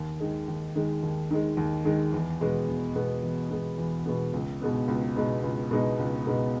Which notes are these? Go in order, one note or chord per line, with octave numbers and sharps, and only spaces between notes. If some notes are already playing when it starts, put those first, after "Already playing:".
Already playing: D#2
D#3 G#3
D#2
D#3 G#3
D#2
D#3 G#3
D#2
D#3 G#3
E2
B2 G#3 B3
E2
B2 G#3 B3
E2
B2 G#3 B3
E2
B2 G#3 B3
C#2
B2 G#3 B3 D#4
C#2
B2 G#3 B3 D#4
C#2
B2 G#3 B3 D#4
C#2
B2 G#3 B3 D#4